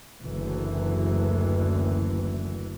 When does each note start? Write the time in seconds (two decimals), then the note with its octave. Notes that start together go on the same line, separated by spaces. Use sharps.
0.21 F#1 D2 E3